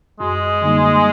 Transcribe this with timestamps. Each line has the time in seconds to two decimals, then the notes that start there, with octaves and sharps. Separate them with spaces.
0.20 F#2 G#3
0.62 D3 G3 A#3 D#4